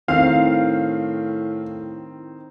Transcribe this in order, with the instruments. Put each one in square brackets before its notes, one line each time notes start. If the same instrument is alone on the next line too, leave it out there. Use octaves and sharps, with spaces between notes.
[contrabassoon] A2 [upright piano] D#3 C4 [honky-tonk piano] F5